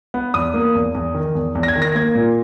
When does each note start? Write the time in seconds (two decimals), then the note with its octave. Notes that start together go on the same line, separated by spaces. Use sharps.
0.14 B3
0.34 E2 D#6
0.54 A#3
0.75 E2
0.95 E2
1.14 D#3
1.35 E2
1.55 E2
1.63 A#6
1.68 G#6
1.76 D#3
1.82 A#6
1.95 A#3 G#6
2.15 A#2